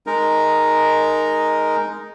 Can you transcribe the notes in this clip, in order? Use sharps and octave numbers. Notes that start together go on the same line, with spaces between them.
G#3 D#4 A#4